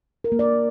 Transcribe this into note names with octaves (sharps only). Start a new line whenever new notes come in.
A#4
A#3
D5